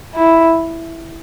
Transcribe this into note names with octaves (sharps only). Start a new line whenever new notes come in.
E4